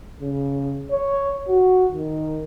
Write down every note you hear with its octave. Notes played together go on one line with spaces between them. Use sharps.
C#3
C#5
F#4
D#3